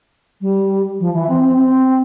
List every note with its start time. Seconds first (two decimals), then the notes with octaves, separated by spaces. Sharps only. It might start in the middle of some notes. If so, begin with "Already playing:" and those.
0.40 G3
0.99 F3
1.13 E3
1.28 C4
1.43 C4
1.57 C4